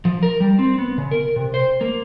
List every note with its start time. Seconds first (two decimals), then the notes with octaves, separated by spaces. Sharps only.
0.05 F3
0.23 A#4
0.40 G3
0.59 C4
0.78 B3
0.98 C#3
1.11 A#4
1.36 C3
1.54 C5
1.81 A#3